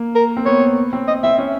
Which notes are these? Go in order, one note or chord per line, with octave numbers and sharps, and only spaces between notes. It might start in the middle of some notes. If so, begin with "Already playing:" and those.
Already playing: A#3
A#4
C4
B3 C#5
C4
D#5
C4 E5
C#4